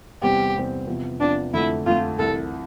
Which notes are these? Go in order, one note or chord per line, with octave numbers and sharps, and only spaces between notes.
E2 C3 G3 C4 G4
E2 C3 G3 C4
E2 C3 F3
E2 C3 F3 D4
F2 D3 A3 E4
F2 D3 A3 F4
C2 C3 E3 A4